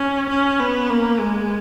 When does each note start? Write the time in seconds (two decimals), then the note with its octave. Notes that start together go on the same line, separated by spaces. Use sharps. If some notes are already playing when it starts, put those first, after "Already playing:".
Already playing: C#4
0.30 C#4
0.60 B3
0.90 A#3
1.19 G#3